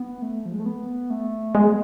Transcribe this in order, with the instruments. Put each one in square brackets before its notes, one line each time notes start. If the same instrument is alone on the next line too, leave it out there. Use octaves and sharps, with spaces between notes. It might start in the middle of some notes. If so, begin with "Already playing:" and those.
Already playing: [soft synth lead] B3
A3
F3
G#3
A3
B3
A3
[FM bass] G#3 [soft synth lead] B3